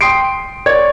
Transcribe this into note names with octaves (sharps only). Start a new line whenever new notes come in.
G5 C6 D#6 C7 D7
C#5 D5 G#6